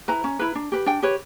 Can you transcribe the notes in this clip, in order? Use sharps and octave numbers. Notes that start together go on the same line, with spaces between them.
E4 B4 A#5
C#4
E4 B4
D4
G4 B4
D4 G5
G4 B4 C#5